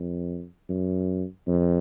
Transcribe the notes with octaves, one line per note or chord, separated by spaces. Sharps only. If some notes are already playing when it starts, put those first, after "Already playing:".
Already playing: F2
F#2
F2